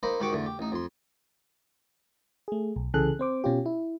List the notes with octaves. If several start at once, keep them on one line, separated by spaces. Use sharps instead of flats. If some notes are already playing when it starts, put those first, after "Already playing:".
A#3 D#4 C5 A#5 B5
G#2 D#3 F#4 G4 C#6 D6
E2 D3 A3
G4
A1 D#4
F2 C6
A3 G#4
B1
C2 C#3 E3 G#4 A4 F#6
C4 C5 D6
B2 C#4 F4 G4
E4